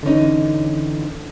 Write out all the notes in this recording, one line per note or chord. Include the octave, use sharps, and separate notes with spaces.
D3 E3 C#4 D#4